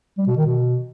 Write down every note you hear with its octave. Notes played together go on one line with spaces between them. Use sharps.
G3
B2
D#3
B2